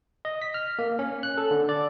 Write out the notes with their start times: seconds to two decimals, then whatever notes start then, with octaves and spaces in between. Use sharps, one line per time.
0.25 D#5
0.42 B6
0.54 F6
0.79 A#3
0.99 C#4
1.23 F#6
1.37 A4
1.51 D3
1.69 D5